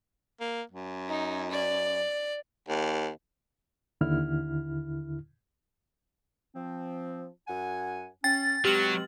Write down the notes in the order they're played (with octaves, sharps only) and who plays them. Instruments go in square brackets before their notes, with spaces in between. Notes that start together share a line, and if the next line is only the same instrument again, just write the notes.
[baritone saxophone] A#3
F#2
[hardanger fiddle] D#4
D5
[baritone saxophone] D#2
[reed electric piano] D#2 D3 E4 F6
[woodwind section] F3 C4
F#2 F#5 G#5
[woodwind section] C#4 [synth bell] G5 [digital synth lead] A6
[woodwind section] B2 G#3 C4 [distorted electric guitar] F#3 [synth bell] G4 F6 F#7